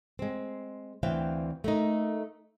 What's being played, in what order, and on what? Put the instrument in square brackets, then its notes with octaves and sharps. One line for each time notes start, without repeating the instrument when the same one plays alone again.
[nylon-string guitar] G#3 C4
D2 E3 C4 E5 F5 G5
A3 A#3 D#4